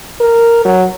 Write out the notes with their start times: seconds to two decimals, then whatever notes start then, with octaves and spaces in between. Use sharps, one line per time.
0.20 A#4
0.65 F#3